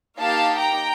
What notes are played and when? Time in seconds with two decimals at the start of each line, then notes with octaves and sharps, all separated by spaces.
0.19 A#3 D#4 G4 F5 A5
0.58 G5 A#5